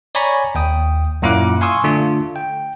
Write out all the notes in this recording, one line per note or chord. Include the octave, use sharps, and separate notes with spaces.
C#5 D5 G#5 A#5 B5 C#6
D#2 G5 D#6
F#2 A#2 E4 F5 D6 F#6
F5 G#5 C6 C#6 D#6 E6
D3 A3 D4 F4
G5